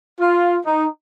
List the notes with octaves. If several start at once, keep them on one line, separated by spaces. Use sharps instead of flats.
F4
D#4